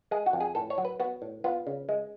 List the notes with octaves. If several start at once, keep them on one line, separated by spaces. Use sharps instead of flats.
G#3 G#4
F#4
F2
G#4
A2 A4
C#5
F#3
B4
B3 F#4
A2
B3 F4
C#3
G#3